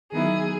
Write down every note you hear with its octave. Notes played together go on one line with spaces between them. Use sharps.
D#3 F#3 B3 E4 G#4